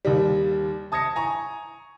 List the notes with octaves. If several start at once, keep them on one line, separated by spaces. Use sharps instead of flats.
D#2 G3
A5 D#6 G#6 A#6 C#7
G#5 A#5 C#6